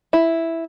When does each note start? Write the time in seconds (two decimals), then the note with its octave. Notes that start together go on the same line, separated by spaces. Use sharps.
0.13 E4